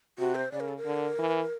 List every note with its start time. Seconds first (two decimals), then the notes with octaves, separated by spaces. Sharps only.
0.19 C3 F#4
0.35 C5
0.52 C#3 D5
0.60 A#4
0.68 A4
0.77 A#4
0.85 D3
1.18 E3